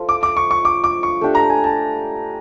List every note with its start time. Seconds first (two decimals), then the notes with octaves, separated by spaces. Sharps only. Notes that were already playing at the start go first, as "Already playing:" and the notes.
Already playing: F3 A3 F4
0.09 D6
0.23 D6
0.37 C#6
0.51 C#6
0.65 D6
0.84 D6
1.03 C#6
1.21 A3 D4 G4
1.35 A#5
1.50 G#5
1.64 A5